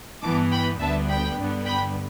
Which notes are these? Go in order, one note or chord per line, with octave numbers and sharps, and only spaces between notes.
G2 E3 B3 A5 D6
G5 B5
D2 D3 G3 B3 E5 A5
G5 B5
G2 D3 G3 B3
G5 B5